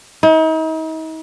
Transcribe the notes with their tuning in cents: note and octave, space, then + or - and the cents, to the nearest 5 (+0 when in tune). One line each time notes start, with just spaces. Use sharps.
D#4 +40